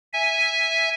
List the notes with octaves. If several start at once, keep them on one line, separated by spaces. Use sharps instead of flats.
E5 G#5